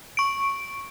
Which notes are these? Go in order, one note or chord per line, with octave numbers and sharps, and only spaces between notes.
C#6 D7